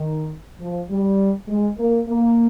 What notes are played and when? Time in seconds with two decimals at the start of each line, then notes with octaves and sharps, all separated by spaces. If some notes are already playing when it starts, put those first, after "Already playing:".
Already playing: D#3
0.60 F3
0.89 G3
1.48 G#3
1.78 A#3
2.08 A#3